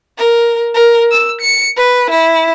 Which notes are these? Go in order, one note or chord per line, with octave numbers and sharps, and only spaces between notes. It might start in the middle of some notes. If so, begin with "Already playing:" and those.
A#4
A#4
E6
C#7
B4
E4